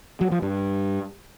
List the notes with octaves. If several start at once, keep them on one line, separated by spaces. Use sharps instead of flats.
F#3
F3
G2